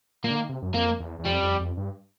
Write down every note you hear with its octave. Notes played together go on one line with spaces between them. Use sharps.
A#2 A#3
D3
D#3
C3
F#2
F2 A#3
E2
E2
F2 G3
F2
F2
G2